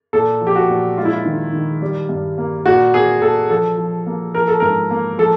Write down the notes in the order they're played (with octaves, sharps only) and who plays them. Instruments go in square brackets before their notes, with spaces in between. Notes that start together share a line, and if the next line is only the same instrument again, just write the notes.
[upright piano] A#2 A4
F3
G4
F#4
A#2
G#3 F4
E4
F4
D#3
D#3
G3
G2
A#3
A#2 F#4
A#3 G#4
A#2 A4
F3 A4
F3
A#3
F3 A#4
A4
G#2 A#4
A#3
F3 A4